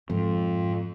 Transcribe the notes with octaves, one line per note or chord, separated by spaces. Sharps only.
F2 G#2 D3